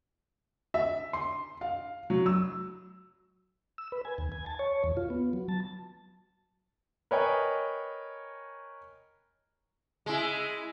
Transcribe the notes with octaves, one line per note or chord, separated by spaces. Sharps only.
E5
C6
F5
F#3
E6
E6
B4
G#5
D#2
G#5
A5
C#5
E2
F4
B3
F#3
A5
A#4 B4 C#5 D#5 G5 G#5
G#3 E4